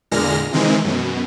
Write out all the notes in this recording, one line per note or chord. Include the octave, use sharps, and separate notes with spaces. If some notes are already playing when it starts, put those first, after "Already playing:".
E2 A#2 D3 G#3 F6 A#6
C3 D#3 E3 G#3 C4
F#2 B2